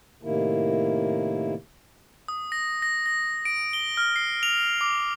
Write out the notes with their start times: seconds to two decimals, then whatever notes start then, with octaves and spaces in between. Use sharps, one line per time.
0.23 A2 C3 D#3 A#3 E4
2.28 D#6
2.52 A#6
2.82 A#6
3.06 A#6
3.45 D7
3.73 G7
3.97 F6
4.16 C7
4.43 F7
4.81 D6